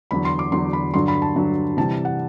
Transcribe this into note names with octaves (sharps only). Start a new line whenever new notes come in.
E2 D3 F#3 B5
C6
D6
E2 D3 F#3 C6
B5
G2 D3 F#3 C6
B5
A5
G2 D3 F#3
C3 E3 G3 A5
F#5